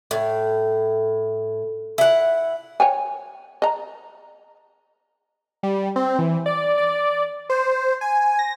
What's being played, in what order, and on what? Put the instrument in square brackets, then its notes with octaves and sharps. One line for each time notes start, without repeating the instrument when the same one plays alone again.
[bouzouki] A2
E4 F#5
[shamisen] C#5 G5 G#5
D#5 A#5
[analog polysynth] G3
C4
E3
D5
D5
C5
G#5
A#6